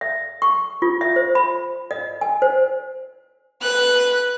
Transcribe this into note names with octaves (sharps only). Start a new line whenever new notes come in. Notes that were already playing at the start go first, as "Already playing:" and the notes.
E5
C#6
F4
E5
C5
B5
D#5
G#5
C5
B4 F#6